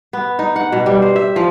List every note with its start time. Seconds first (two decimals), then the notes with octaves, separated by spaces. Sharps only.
0.13 B3
0.39 D#4
0.56 F#5
0.72 B2
0.86 G3
1.02 C5
1.16 E5
1.36 F3